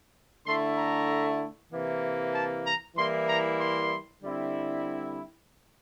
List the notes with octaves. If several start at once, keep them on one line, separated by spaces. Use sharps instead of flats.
D3 A3 E4 C6
A#5
C3 E3 A#3
A5
A#5
E3 G3 A#3 E4 C6
A#5
C6
D3 G3 C4 E4